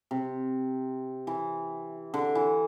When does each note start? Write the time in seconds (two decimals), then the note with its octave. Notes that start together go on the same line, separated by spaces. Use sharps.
0.11 C3
1.27 E3
2.14 D3
2.35 E3